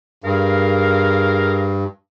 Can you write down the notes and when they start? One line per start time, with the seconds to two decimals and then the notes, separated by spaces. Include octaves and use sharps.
0.24 G2 G#4 A#4 F5